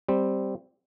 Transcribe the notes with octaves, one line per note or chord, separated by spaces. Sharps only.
G3 C4